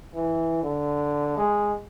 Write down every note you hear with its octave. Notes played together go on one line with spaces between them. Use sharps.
E3
D3
G#3